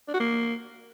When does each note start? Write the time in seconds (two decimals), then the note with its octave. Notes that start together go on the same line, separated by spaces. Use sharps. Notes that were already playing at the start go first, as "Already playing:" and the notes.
0.08 D4
0.14 F#4
0.20 A#3